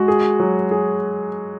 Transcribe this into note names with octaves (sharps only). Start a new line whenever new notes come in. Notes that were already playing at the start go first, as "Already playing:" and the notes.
Already playing: G#3 F#4
G#4
F#3
G#4